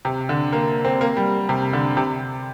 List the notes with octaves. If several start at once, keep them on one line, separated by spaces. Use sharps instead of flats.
C3
D3
A#3
C4
A#3
G3
C3
D3
C3